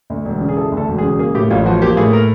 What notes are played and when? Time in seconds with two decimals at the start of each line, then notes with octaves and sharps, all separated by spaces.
0.10 D2
0.25 E1
0.41 C#3
0.49 G#4
0.56 E3 A4
0.72 D2
0.77 A4
0.88 E1
0.98 G#4
1.03 C#3
1.19 A#3 G#4
1.35 A2 G4
1.50 A1 F4
1.66 F3 F#4
1.82 A#3 G4
1.97 A2 G#4
2.13 A#4